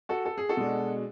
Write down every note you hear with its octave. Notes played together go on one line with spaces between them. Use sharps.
F#4 A4
A4
G#4
F#4 A4
B2 G#3 D4